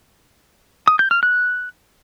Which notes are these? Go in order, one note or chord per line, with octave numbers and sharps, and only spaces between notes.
D#6
G6
F6
F#6